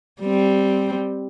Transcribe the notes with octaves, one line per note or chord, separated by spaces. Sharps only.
G3 C4